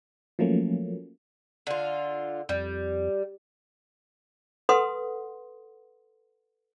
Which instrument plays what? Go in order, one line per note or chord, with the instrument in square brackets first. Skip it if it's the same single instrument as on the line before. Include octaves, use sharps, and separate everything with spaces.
[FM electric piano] F3 F#3 A3 A#3 C#4
[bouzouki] D3 F4
[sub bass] F2 [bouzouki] G3
[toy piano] A4 B4 F#5 C6 D#6